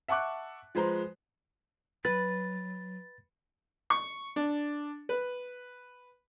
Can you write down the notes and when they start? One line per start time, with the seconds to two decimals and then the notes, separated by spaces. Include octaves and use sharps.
0.08 E5 F#5 A5 C#6 D6 F#6
0.75 F3 G#3 B4 C5 A#5
2.05 F#3 B4 A6
3.90 C#6
4.36 D4
5.09 B4